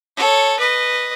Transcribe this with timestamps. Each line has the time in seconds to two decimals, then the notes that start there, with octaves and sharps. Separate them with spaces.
0.17 A4 C#5
0.59 B4 D#5